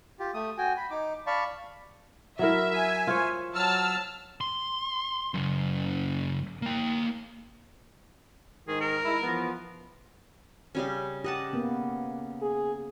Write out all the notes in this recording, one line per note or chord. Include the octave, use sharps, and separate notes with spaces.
F4 G4
A3 D#6
F#4 G5 G#5
B5
D#4 D6
D5 F5 A5 B5 C#6
F#3 E4 A#4 E5
G#5
F4 C5 C#5
F#3 A5 E6 F6
C6
F#2 C#3
A#3 G5
G#2 D#3 G#4
A#4
G#3 E4
E3 F3 B3
C#3 G3 C#4
G4 D#5 F#5 A5
A#3 B3
G#4